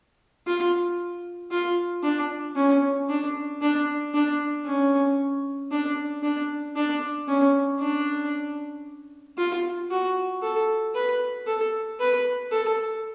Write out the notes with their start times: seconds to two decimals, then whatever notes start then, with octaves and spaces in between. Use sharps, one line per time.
0.47 F4
1.51 F4
2.04 D4
2.56 C#4
3.09 D4
3.62 D4
4.14 D4
4.66 C#4
5.71 D4
6.23 D4
6.76 D4
7.28 C#4
7.80 D4
9.38 F4
9.91 F#4
10.42 A4
10.95 B4
11.47 A4
12.00 B4
12.52 A4